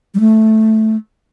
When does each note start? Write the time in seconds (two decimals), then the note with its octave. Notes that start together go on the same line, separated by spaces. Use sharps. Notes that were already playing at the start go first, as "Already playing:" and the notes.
0.14 G3
0.20 A3